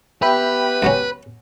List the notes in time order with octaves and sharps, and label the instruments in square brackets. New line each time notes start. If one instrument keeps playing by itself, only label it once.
[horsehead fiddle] B3 G4 [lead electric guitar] B4 [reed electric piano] E5 G5 B5
[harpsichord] C#2 F#3 C#4